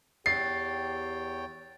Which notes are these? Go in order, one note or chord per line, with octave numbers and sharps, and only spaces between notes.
E2 G4 C#5 G5 A6 C7